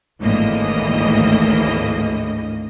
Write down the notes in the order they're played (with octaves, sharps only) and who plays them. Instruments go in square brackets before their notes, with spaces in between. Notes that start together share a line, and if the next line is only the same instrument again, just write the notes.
[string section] G#1 D2 A2 E3 A#3 D#5